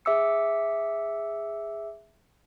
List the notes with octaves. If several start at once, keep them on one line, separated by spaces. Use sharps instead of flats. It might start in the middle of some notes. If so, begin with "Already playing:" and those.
G#4 E5 D6 E6 C#7